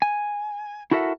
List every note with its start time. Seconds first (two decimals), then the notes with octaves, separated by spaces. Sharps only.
0.02 G#5
0.91 E4 F#4 A4 A#4 E5 F#5